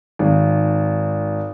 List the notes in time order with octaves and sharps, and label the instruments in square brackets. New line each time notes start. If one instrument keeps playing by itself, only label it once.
[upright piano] G#1